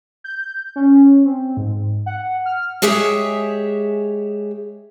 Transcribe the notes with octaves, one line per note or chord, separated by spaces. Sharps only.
G6
C#4
C4
G#2
F#5
F6
G#3 G4 G#4 C#5 E5